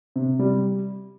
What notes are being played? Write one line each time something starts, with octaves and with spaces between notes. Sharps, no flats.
C3
G3